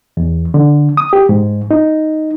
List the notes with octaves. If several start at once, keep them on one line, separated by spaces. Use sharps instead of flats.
E2
D3
D#6
G4
G#2
D#4